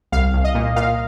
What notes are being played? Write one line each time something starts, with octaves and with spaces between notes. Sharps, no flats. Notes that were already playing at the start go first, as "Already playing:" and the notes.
C2 F5
C2
D#5
A#2
A#2 F5